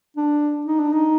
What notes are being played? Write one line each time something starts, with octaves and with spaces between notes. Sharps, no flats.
D4
D#4
D4
D#4